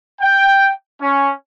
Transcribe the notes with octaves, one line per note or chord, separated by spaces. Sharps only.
G5
C#4